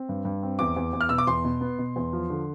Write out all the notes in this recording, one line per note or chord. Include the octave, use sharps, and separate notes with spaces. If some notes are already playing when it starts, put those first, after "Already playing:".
Already playing: C4
G2
G2
C4
E2 D6
E2
E2
F6
B2 E6
D6
E2 C6
B2
B3
B2
E2
F3
D3